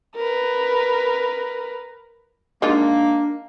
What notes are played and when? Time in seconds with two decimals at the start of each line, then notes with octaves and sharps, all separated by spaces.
0.16 A#4 B4
2.62 G#3 A#3 D4 D#4 F4